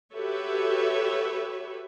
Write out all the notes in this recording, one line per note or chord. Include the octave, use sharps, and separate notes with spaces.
F#4 G4 A4 B4 C#5 E5